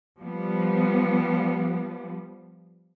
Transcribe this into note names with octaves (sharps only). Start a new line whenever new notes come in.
F3 G3 B3